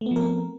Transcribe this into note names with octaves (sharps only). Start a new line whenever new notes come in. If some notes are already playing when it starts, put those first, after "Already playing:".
F3 A3 B3 C4 A#4